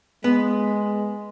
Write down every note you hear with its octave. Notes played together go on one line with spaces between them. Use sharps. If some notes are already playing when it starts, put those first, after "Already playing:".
G#3 B3